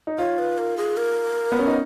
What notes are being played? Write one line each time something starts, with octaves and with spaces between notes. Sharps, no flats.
D#4
F4 C#5
B4
A#4
G#4
A#4
B3
C#4
D#4